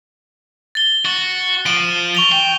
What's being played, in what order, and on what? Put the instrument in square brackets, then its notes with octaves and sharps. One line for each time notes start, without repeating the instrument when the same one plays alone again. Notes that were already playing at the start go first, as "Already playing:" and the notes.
[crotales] A6 G7
[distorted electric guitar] F#4 [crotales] A6
[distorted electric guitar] F3 [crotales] D7 D#7 F#7
[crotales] C#6 F7 G7
[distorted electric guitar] G5